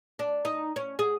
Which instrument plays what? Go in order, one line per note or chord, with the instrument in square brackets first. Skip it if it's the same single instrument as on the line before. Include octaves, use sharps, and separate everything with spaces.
[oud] D4
D#4
C#4
G#4